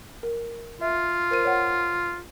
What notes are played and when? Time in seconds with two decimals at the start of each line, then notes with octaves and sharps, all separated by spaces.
0.23 A#4
0.81 F4 E5
1.31 A#4 C5 D#7
1.45 C#5 F#5